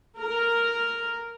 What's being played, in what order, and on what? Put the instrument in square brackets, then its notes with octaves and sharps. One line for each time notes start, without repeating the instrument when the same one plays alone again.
[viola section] A#4